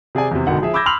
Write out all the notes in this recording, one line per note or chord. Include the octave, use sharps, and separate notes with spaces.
C3 G#4 D5 G#5
E2 C3
G#1 B2 D3 D#3 F#5
F3 G#4 E5
B5 D6 E6 G6 G#6 A#6
B5 C6 E6 F6 F7 F#7